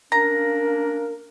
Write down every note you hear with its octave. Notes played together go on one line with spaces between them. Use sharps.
A#3 C#4 D4 A#4 A#5 A#6